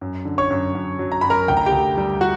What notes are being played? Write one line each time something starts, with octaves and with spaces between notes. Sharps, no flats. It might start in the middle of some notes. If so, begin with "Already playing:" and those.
F#2
D3
C#5 C#6
F#2
F#2
F#3
A#5
F#2 B5
A#4 A#5
D2 G5
A#5
G4 G5
D2
G3
F#4 F#5